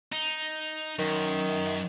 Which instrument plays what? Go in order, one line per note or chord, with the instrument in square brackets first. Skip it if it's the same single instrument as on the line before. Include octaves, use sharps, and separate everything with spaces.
[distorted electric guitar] D#4
[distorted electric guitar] F#2 [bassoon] D#3